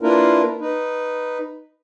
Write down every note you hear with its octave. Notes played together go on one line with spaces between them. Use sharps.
A#3 D4 E4 F4 A#4 B4
D#4 B4